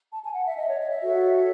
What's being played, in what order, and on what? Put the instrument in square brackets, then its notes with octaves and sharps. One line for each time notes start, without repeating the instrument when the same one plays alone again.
[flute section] A5
G#5
F#5
E5
D#5
C#5
D#5
E5
F#4 A4 C#5